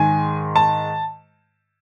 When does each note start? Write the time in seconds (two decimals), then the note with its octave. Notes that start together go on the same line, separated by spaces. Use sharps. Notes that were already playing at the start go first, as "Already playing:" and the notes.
Already playing: G#2 D#3 G#3 G#5
0.56 A5